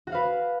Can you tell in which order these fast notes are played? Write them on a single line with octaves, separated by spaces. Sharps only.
F#4 F#5 F5 B4